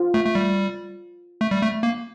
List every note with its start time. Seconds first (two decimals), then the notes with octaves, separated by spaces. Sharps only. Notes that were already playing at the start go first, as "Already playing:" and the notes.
Already playing: F4
0.14 A3
0.25 A3
0.35 G3
1.41 A3
1.51 G3
1.62 A3
1.83 A#3